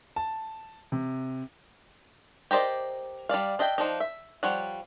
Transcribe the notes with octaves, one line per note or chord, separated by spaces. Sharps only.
A5
C3
G4 A#4 C5 D5 D#5
G3 D4 D5 F5
D4 D#5 E5 G5
F3 D4 D#4
E5
F3 G3 C#5 F#5